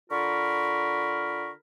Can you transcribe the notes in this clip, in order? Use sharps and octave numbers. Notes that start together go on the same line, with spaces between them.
D3 F4 A#4 B5 C#6